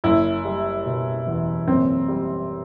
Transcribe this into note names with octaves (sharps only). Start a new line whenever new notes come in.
F#1 E4
G3
B2
E2
F#1 C4
G3